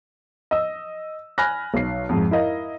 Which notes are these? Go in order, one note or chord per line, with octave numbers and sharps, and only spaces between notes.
D#5 E6
G#5 B5 F6 F#6 A#6
B1 C7
F2 G#2
E4 A#4 D#5 F5